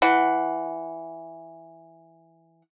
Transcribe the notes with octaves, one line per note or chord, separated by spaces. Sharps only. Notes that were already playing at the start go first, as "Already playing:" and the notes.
E3 F#5